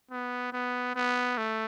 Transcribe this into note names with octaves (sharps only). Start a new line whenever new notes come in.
B3
B3
B3
A3